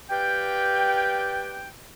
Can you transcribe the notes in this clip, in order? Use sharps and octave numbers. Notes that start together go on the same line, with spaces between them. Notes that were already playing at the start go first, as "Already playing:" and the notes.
G4 B4 D5 F5 G5